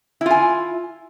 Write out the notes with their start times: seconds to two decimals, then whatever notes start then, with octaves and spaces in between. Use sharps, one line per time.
0.21 E4
0.26 F4
0.31 G#5